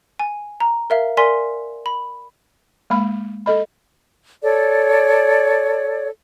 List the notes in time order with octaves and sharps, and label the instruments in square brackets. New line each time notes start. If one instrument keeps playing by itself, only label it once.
[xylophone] G#5
A#5
A#4 E5 F5
A#4 D5 G#5 C6 B6
B5
[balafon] G#3 A#3 B5
A4 D#5 B5
[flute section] A4 C#5 D5